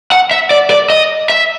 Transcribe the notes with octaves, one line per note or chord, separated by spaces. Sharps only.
F#5
E5
D5
D5
D#5
E5